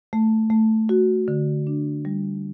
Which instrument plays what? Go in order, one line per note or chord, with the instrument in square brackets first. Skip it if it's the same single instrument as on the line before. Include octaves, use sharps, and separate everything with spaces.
[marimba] A3
A3
F#4
D3
D4
G3